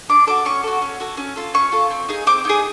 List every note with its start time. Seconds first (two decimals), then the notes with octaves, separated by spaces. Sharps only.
0.09 D4 D6
0.27 F#4 A4 D6
0.45 C#4 C#6
0.63 F#4 A4
0.82 C#4
1.00 F#4 A4
1.17 C#4
1.36 F4 A4
1.54 C#4 C#6
1.72 F4 A4
1.90 C4
2.09 D#4 G#4
2.27 C4 D6
2.45 D#4 G#4